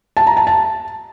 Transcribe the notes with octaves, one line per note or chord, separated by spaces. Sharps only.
A5
A#5
A5
A5